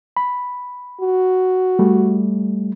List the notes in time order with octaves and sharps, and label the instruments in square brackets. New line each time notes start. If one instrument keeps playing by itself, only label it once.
[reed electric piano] B5
[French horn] F#4
[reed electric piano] G3 A3